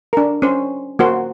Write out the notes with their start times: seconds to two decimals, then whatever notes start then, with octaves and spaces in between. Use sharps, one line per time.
0.13 D4 A#4
0.42 C#4 C5
0.99 A#3 F#4 C5